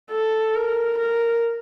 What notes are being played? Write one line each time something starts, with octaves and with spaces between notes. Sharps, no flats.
A4
A#4
A#4